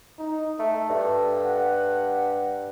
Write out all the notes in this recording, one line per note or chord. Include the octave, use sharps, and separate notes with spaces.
D#4
A3 A4
G2
F#5